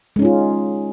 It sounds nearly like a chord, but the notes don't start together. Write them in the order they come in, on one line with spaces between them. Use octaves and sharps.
G#3 C#4 D#4 F4